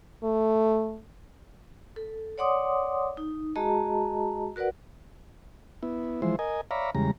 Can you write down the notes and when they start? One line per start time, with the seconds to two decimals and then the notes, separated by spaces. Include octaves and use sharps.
0.23 A3
1.96 A4
2.38 C#5 D5 F#5 C6 D6 D#6
3.17 D#4
3.56 G#3 F#4 G#4 D#5 A5 A#5
4.56 F#4 A#4 B4 D5 F#5
5.83 B3 E4
6.22 E3 F3 G#3 E4 C5
6.39 A#4 D#5 G#5
6.71 C#5 D5 E5 F5 A#5 B5
6.95 E2 C#3 G3 G#3 A#5